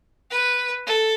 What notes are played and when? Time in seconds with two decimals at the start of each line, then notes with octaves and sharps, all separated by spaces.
0.31 B4
0.87 A4